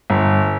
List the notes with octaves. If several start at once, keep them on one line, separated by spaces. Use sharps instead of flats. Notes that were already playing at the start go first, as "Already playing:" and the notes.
G1